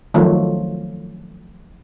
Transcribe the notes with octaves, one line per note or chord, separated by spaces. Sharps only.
D#3 F3 F#3 A3